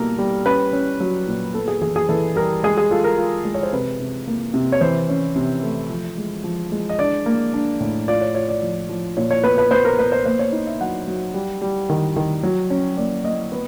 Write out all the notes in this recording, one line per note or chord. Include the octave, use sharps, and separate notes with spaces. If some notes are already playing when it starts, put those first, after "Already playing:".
Already playing: B2 G3 A#3 A4 A#4
G3
C#4 B4
C#4
F#3
A#2
B3 A4
G#4
E3 G#4
G#4
E3 A4
G3 A#4
G#3 G#4
G#4
F4 A4
A#4
F4
G#3
C#5
C5
C3 B4
C3
A#3
C3
C#5
E3 C5
C#4
C3
A3
F3
G#3
F3
G#3
D#5
D4 D5
A#3
D4
A2
F4 D5
C#5
F4 C#5
D5
F3
F3
A#2 C#5
C#5
B3 B4
B4
B3 C5
A#4
B3 B4
C5
A#3 C5
C#5
D#4
E5
F#3 F#5
F#3
G3
G3
D#3
D#3
F#3
C#4
A#3 D5
A#3 D#5
B3